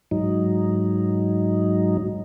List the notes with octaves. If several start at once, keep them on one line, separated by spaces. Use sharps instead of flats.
G#2 F#3 D#4